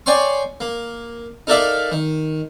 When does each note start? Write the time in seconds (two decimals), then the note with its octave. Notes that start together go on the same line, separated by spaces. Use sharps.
0.06 C#5 D5 G5 G#5 C6 C#6
0.60 A#3
1.47 D#4 A4 A#4 D5 E5 F5
1.92 D#3